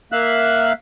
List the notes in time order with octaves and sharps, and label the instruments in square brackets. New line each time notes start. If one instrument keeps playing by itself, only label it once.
[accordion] A#3 E5 F5 F#6